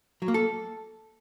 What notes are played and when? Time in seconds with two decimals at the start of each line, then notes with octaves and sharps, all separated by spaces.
0.22 F#3
0.28 A#3
0.34 A4